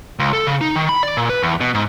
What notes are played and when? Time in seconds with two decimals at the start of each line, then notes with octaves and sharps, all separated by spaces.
0.19 C#2
0.33 A4
0.47 C#3
0.61 D#4
0.76 D#3
0.89 B5
1.03 D5
1.17 A#2
1.29 B4
1.43 E2
1.60 B2
1.74 G#2